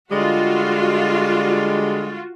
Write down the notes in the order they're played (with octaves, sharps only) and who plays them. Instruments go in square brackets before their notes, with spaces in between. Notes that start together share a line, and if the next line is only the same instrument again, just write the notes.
[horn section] D3 G3 G#3 [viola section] F4 F#4